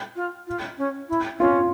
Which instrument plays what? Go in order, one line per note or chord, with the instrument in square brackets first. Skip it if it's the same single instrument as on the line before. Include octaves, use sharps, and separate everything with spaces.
[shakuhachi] F4
F4
C#4
E4
[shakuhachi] C#4 [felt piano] F4